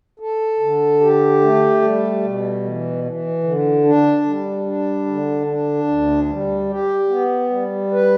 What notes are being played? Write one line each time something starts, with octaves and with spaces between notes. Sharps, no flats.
A4
D3
G4
A3
G3
B2
E3
E3
D3
D4
G3
D4
D3
D4
D2
G3
G4
B3
G3
B4